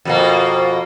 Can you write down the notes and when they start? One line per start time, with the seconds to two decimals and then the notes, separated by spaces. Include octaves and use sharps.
0.05 F2 B2 A#3